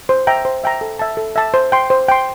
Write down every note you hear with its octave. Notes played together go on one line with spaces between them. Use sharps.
C5
E5 G5 A#5
C5
E5 G5 A#5
A4
E5 A5
A4
E5 A5
C5
G5 C6
C5
G5 C6